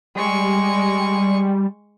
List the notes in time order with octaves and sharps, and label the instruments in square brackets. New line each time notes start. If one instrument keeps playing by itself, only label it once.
[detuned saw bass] G3 [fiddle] G#3 C#6